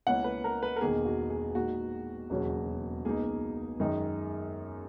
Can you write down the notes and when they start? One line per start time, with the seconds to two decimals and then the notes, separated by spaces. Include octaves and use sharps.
0.07 C#2 B2 A#3 C#4 E4 F#5
0.24 B4
0.44 A#4
0.63 B4
0.76 A#4
0.81 E1 E2 D#3 A#3 D#4 G#4
1.05 F#4
1.30 G#4
1.55 A#2 G#3 D#4 F#4
2.30 E1 D#2 C#3 F#3 C#4
3.04 C#2 B2 A#3 D#4 G#4
3.80 F#2 D#3 G#3 D#4